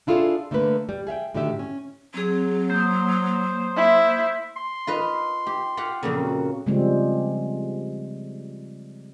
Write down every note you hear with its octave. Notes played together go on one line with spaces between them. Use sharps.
D4 E4 F4 G#4 A4 D5
D3 A3 A#3 A#4 B4
G3
G#4 E5 F5 G5
A2 D3 D#3 F#4 G4 E5
C#4
F#3 C4 G#4
A#3 C5 D#6
E4
C6
F4 B4 D#5
G4
F4 G4 F#5
F2 A#2 C#3 C4
F#4
C#3 F3 G3 G#3 C4